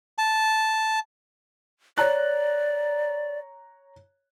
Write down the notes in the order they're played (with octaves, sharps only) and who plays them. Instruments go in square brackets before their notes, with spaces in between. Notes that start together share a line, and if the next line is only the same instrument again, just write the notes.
[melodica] A5
[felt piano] C#5 A#5 F#6 [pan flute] D5